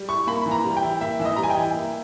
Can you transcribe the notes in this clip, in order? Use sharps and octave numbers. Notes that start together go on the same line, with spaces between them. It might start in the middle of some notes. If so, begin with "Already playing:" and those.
Already playing: G3
E4 C#6
A#3 B5
E3
A#5
G3
G5
E4
A#3 E5
E3 E5
D#5
G3 A#5
G#5
G5
E4
A#3